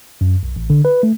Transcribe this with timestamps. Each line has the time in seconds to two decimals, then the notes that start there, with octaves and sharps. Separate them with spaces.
0.21 F#2
0.43 B1
0.56 A1
0.70 D3
0.85 B4
1.03 A3